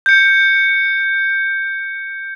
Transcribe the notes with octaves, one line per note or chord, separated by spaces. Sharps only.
G6 C#7